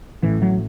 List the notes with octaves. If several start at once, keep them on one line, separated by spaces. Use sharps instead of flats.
A1 A2 E3
F#3